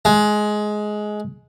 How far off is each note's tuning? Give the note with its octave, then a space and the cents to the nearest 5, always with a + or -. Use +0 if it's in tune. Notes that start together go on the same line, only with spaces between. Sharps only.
G#3 +15